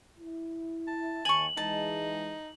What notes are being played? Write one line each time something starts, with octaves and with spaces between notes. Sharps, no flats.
E4
A5
D#2 G#5 C#6 F#7
E3 G#3 D#4 A5